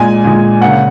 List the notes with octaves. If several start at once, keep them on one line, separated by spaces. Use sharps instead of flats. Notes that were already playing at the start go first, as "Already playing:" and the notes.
Already playing: A#2 G#3 G#5
A#2 G#3
C#3 A#3 F#5